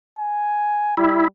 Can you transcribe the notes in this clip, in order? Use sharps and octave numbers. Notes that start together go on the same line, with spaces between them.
G#5
G3 E4